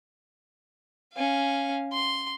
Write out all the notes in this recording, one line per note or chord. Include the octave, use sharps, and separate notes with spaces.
C#4 F5
C6